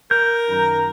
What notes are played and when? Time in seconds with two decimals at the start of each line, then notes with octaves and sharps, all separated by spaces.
0.11 A#4 G6
0.48 F#2 D#3 A#5